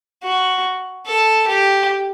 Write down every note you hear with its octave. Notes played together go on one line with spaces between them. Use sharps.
F#4
A4
G4